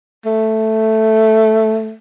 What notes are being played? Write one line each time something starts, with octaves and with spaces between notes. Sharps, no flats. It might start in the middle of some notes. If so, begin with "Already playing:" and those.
A3